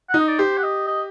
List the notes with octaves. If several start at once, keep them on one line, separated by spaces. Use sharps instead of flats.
D#4 F#5
D#5
D5
G4 C5
F#5
D#5
D#5